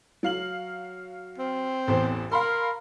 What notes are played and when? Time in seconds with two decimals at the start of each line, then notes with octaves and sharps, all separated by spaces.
0.23 F#3 F5 F#7
1.38 C4
1.88 A1 E2 C5
2.32 A#4 F5 B5 C6